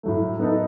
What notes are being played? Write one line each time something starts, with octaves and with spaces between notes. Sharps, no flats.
A2 F#3 A3
B3 D#4 A4